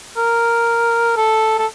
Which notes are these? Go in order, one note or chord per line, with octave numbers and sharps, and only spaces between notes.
A#4
A4
A4